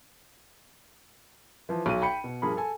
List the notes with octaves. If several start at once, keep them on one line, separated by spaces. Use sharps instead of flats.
E3 F3
B1 F#3 D#7
G5 B5 C#7
B2
G2 F3 G#4 A#4 B5
A4 G#5